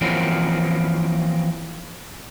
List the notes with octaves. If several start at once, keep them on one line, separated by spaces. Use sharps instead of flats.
E3 F3 A#3 C4 C#4 F#4